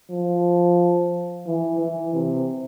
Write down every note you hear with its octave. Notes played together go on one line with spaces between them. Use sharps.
F3
E3
E3
C3